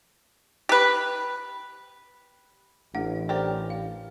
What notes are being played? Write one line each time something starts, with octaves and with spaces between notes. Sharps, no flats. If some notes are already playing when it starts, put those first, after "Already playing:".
G4 B4
A1 A3 D4 F#5
G4 A#4 C5 D5
F5